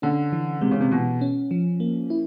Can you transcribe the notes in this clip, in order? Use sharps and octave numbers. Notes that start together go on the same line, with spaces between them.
D3 C#4
E3
C3 G#3
C#3
C3
B2 E3
C#4
F3
A#3
E4